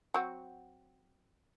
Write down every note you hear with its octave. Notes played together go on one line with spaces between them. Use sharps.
F#3 C4 F#4